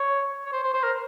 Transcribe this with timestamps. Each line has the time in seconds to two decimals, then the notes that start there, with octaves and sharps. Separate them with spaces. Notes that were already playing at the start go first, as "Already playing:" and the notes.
Already playing: C#5
0.46 C#5
0.53 C5
0.64 C5
0.74 C5
0.84 A#4